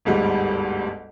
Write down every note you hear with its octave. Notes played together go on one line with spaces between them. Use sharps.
G1 D2 G#2 G3